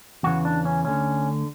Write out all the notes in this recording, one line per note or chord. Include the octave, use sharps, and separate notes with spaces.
E2 C#3 E3 F#4
D4
C#4
D2 D3 C#4